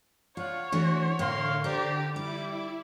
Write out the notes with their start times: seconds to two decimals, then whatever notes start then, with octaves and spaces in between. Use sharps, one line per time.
0.37 D4 F4 C#5 F5 F#5
0.72 E3 A3 D4 F#4
1.19 A2 D3 A#4 F5 C6
1.64 D4 G4 C5 D5 A#5
2.16 G3 E4 D5 D6